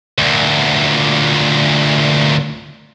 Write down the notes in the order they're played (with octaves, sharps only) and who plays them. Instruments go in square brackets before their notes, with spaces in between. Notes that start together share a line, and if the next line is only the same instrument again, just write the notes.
[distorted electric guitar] D2 A#2